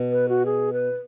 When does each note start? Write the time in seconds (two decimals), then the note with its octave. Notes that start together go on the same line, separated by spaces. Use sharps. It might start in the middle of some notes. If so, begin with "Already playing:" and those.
Already playing: B2
0.11 B4
0.29 F#4
0.46 G#4
0.73 B4